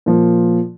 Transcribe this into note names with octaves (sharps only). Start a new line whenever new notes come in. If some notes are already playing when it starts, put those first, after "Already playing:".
A#2 F3